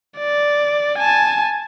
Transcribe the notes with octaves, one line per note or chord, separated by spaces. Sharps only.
D5
G#5 A5